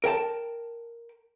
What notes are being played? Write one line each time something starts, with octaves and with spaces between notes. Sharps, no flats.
A#4 G5 A5